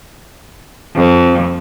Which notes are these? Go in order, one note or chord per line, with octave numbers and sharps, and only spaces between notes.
F2